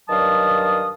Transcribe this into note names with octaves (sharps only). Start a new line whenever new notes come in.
G2 D#3 F#3 F5 A5 D#6